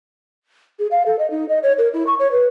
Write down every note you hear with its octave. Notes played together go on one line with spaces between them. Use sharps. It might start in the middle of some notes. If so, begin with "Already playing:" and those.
G#4
F5
A4
D#5
D#4
D#5
C#5
A#4
E4
C#6
C#5
B4